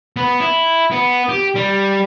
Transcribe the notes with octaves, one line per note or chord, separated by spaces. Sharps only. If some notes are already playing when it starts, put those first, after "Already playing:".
B3
E4
B3
G4
G3